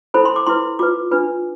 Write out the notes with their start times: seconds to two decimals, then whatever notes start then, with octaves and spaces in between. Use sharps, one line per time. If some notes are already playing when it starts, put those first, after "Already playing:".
0.14 E4 A4 C5 B5
0.25 C6
0.36 D6
0.46 E4 B4 C6
0.79 F4 B4 D6
1.11 D4 F4 B4